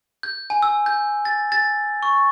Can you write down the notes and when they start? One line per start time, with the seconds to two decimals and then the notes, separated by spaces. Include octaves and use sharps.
0.23 G6
0.50 G#5
0.63 E6
0.86 G6
1.25 A6
1.52 A6
2.03 C#6